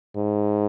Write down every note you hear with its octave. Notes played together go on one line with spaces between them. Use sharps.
G#2